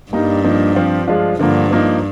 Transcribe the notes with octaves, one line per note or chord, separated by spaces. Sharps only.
G2 G3 A#3 D#4
F3 A#3 D#4
F3 C4 F4
F3 G#3 D4 F4
G2 D3 F3 A#3
F3 A#3 D#4